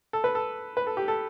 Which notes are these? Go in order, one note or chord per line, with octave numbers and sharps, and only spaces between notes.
A4
B4
A4
B4
A4
G4
A4